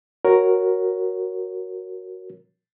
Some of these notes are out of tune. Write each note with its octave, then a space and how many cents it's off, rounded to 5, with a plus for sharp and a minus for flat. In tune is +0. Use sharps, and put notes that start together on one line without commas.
F#4 +0 A#4 +0 C#5 -5